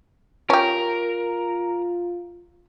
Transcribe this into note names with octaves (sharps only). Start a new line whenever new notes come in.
C#4 F4 G4 A#4